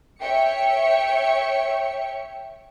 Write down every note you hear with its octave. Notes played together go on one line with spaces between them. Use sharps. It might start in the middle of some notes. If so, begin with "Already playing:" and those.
C#5 E5 G5 C#7